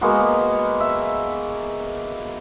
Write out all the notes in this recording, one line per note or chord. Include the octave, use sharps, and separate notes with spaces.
G#3 A#3 B3 F#4
E5